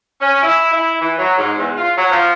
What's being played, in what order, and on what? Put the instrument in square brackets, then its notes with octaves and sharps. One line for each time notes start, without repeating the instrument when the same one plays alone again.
[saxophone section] C#4
E4
E4
E3
F#3
G#2
E2
F4
F#3
F3